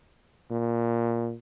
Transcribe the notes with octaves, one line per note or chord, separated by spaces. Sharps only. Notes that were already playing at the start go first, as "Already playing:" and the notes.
A#2